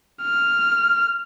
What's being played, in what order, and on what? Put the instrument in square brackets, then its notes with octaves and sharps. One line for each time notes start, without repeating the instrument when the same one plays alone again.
[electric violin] F6